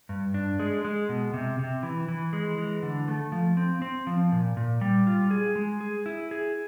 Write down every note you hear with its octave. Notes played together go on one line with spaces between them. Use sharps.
G2
D4
G#3
G#3
B2
C3
C3
E3
E3
G#3
E3
D3
A3
F3
C4
C4
F3
A#2
A#2
G3
F4
G#4
G#3
G#4
E4
G#4